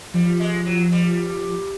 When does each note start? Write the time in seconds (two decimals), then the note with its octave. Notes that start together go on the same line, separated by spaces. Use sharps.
0.14 F3 G3
0.40 G#3
0.65 F#3
0.92 G3